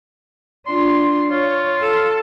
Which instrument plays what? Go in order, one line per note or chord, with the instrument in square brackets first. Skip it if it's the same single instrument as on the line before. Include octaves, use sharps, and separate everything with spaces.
[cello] D4 F4 [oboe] C6
[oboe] F4 [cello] C#5
[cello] A4